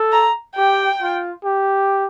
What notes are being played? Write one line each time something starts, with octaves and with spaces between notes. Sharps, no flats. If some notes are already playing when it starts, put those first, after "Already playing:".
Already playing: A4
A#5
G4 G5
F4
G4